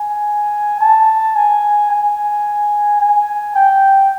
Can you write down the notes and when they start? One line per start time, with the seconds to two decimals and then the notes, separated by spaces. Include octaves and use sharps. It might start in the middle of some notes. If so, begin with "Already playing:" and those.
Already playing: G#5
0.81 A5
1.36 G#5
1.90 G#5
3.00 G#5
3.55 G5